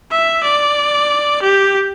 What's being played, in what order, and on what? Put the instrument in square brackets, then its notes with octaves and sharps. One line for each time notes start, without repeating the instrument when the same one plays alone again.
[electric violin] E5
D5
G4